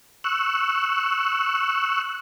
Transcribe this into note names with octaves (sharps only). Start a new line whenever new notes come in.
C#6 E6 F#6